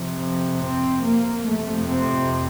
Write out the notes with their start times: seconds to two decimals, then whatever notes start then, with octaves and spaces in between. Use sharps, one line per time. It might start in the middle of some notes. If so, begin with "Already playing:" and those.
Already playing: F2 C3
0.62 C4
1.04 A#3
1.47 F2 C3 A3
1.90 C4